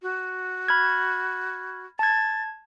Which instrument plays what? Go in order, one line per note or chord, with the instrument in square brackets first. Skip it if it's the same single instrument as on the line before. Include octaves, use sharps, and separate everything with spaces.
[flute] F#4
[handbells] B5 F6 G#6
[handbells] A5 G#6 [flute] A6